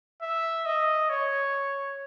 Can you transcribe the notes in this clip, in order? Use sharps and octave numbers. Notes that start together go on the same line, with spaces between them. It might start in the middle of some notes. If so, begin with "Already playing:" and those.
E5
D#5
C#5